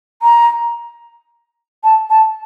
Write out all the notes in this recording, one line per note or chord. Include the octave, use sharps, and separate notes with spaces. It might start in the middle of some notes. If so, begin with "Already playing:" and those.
A#5
A5
A5